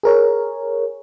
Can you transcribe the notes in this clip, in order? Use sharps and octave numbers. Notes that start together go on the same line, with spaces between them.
G#4 A#4 C#5